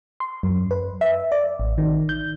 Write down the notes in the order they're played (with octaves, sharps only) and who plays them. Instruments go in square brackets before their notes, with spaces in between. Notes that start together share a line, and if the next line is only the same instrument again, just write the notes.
[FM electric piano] C6
F#2
B4
E5
D5
A1
D#3
G6